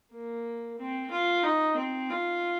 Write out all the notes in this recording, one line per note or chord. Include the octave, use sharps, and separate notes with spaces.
A#3
C4
F4
D#4
C4
F4